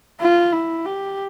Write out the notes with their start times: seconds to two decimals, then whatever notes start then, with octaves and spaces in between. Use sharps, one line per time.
0.21 F4
0.53 E4
0.86 G4